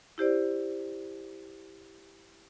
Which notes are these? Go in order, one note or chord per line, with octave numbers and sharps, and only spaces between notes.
E4 G4 C5 D5